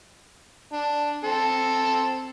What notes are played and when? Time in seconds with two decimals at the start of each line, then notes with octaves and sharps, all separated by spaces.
0.73 D4
1.24 C4 A4